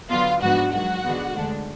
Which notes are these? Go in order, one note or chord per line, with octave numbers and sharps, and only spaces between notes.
D3 F#3 B3 F4 F5
G#2 F3 B3 D4 F#4 F#5
G#2 D#3 F#3 F#4 F#5
D3 G#3 B3
D2 D3 G#3 D4